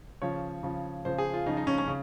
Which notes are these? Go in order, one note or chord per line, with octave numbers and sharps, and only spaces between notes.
C#3 F3 C#5
C#3 F3
C#3 F3 C5
G#4
F4
C#3 F3 D#4
D#4
C#4
C#4
C#3